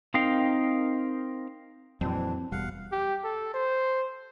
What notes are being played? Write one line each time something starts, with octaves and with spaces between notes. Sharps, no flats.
C4 D#4 A#4 F5 G5
F2 A#2 E3 F#3 C4 D4
E1 B2 G3 F5 F#5
G4
A4
C5